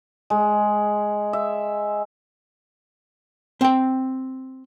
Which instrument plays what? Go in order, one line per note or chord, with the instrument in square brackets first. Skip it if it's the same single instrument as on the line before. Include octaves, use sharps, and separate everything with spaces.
[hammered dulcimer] G#3
E5
[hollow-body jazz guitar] C4 G5